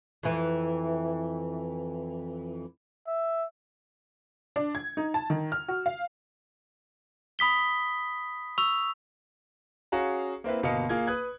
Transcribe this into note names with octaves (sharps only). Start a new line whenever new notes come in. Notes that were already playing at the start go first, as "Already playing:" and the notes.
F2 E3
E5
D4
G#6
D#4
A5
D#3
F6
F#4
F5
B5 D#6 B6 G7
C#6 E6 F7
C#4 F#4 G#4 F5 A#5
A#3 C4 E4 B4
G1 B2 A#3 D#5 F5 C#7
A#3 F4 G#4 G#6
B4 D#6 F#6 G#6